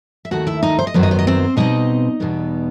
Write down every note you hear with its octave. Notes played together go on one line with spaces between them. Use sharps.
E5
D#2 D#3 A3 F#4 F#5
E4 E5
D#4 D#5
C5
D#5
F#2 D#3 F#3 B3 C5
D#5
C5
D#5
C4 C5
B2 G3 C4 D#4 D#5
E2 B2 G3 B3